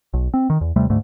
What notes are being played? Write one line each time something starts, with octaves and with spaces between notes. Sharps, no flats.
B1
C4
D#3
E2
D#2 C3 G3 A3
D2 G#2 A3